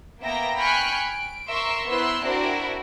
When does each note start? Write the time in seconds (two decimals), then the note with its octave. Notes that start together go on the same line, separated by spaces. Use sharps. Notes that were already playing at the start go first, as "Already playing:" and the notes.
0.20 A#3 B3 E5 G5 A#5 A#6
0.58 G5 G#5 B5 C#6 F6 F#6
1.06 D7
1.51 A#4 E5 C6 C#6 E6
1.87 B3 E4 C5 C6 E6 F#6
2.23 C4 D4 E4 F#4 A#4